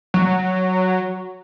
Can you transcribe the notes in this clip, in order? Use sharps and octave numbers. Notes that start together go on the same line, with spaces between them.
F#3